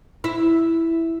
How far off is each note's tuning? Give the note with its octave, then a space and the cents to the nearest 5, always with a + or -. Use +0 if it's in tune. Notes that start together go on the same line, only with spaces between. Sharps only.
E4 +0